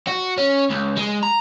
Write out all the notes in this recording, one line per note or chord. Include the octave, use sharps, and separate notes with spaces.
F#4
C#4
C#2
G#3
A#5